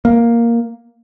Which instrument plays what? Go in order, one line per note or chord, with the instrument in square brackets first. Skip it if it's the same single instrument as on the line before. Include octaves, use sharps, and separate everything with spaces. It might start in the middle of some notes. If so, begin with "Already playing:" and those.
[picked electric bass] A#3